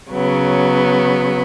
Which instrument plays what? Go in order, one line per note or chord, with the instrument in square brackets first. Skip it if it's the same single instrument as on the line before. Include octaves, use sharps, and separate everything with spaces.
[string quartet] C#3 F#3 B3